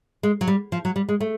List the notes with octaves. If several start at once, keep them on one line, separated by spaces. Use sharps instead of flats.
G#3
F#3
G3
F3
F#3
G3
G#3
A3